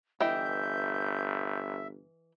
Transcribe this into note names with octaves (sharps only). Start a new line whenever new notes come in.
G1 E3 D#5 E5 G5 G6